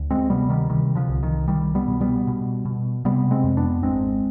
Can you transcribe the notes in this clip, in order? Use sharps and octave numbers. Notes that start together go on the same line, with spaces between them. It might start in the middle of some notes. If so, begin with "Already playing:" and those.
Already playing: D2
G#3 C4
C3 G3 B3
D#3 G3
C3 D#3 G3
D3 F3
C2
D#3
C2 D#3 G3
G3 B3
B2
G3 B3
B2
B2
C3 G3 B3
G#3 C4
F2
B3 D4
G#1 G#3 C4